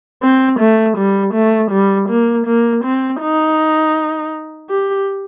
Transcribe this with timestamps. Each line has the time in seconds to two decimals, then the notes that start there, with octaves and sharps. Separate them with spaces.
0.23 C4
0.60 A3
0.97 G3
1.34 A3
1.71 G3
2.09 A#3
2.46 A#3
2.84 C4
3.21 D#4
4.70 G4